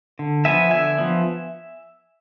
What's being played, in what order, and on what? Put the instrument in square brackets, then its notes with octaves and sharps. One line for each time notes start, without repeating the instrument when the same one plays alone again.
[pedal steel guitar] D3
F3 B3 E5 G#5
D3 E5 G#5
F3 B3